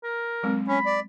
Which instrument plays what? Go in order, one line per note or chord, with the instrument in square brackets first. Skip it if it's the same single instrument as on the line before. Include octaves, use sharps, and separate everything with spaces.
[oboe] A#4
[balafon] F#3 G#3 C4
[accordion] C#4 [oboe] B5
[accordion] D5